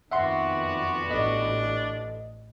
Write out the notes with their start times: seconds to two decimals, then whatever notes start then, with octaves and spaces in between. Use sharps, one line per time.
0.11 F2 D#3 B3 F#4 D5 E5 F#5 C6
1.10 A1 D4 A4 D#5